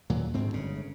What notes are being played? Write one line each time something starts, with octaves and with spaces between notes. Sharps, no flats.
D#2 A#2 F#3
D2 G#2 C4
G1 C#3